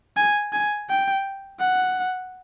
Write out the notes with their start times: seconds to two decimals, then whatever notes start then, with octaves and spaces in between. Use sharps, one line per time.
0.17 G#5
0.53 G#5
0.89 G5
1.60 F#5